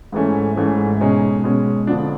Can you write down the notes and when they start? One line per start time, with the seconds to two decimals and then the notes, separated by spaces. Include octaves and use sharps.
0.12 G#2 E3 A3 C#4
0.56 G#2 E3 A3 C#4
1.00 B2 G#3 C#4 D#4
1.44 B2 G#3 C#4
1.87 F2 D3 F3 D4